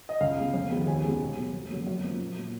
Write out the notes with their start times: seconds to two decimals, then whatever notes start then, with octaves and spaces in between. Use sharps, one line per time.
0.09 D#5
0.21 C#2 F5
0.37 C#3 G#3 B3
0.54 F2
0.71 D#3 G#3 B3
0.87 D#2 G#5
1.04 C#3 G#3 B3
1.20 B2
1.37 F#3 B3
1.54 F2
1.70 C#3 F#3 A#3
1.87 F#2
2.03 F3 A#3
2.20 A#2
2.37 F#3 A#3